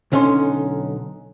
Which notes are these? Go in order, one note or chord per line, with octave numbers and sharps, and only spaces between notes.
B1 D3 C#4 D#4 C6